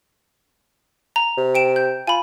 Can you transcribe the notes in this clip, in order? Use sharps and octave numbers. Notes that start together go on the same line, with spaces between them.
A#5
C3
G5 D7 E7
G6
F4 G#5 B5